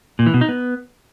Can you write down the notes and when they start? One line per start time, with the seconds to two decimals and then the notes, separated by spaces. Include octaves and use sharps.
0.19 A#2
0.26 E3
0.34 B2
0.41 D#4
0.49 B3